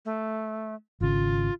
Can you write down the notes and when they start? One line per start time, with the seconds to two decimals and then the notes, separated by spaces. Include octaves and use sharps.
0.05 A3
1.01 G#1 C#3 F4